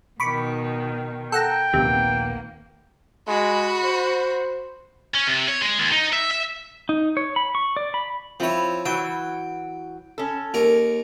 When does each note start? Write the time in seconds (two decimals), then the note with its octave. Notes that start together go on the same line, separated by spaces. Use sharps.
0.20 B2 D#3 B5 C#6 D6
1.32 A4 F#5 G5 A#5
1.74 A#1 D#2 C3 A#3 B3
3.28 G#3 F#4 B5
3.84 C5
5.15 C#4
5.28 C3
5.48 C#5
5.61 G#3
5.79 D#2
5.92 D#4
6.13 E5
6.31 E5
6.89 D#4
7.17 C#5
7.36 B5
7.55 C#6
7.77 D5
7.94 B5
8.40 F3 C4 E4 C#5
8.85 E3 F#3 F#4 G5
10.18 C#4 A4
10.54 D#2 A#4